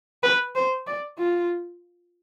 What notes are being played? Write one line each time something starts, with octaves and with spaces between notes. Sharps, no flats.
B4
C5
D5
F4